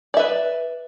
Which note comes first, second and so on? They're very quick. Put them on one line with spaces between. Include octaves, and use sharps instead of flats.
D5 E5 B4